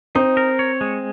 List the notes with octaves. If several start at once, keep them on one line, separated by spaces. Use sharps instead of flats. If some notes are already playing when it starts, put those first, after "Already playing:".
C4 D#4
A#4
C#5
G#3